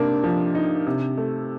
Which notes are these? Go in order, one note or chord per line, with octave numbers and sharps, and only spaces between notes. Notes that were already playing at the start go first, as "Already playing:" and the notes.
Already playing: C3 A#3 D4 D#4
F3
D#4
C3
A3